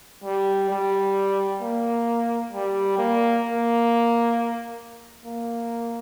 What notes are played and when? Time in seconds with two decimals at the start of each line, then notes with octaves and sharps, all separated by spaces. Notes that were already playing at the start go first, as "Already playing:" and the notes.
0.24 G3
0.70 G3
1.61 A#3
2.53 G3
2.98 A#3
3.44 A#3
5.26 A#3